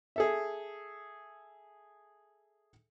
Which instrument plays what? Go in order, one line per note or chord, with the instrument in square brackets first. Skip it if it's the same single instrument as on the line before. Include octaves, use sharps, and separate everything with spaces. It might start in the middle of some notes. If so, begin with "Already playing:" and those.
[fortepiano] G#4 A4 E5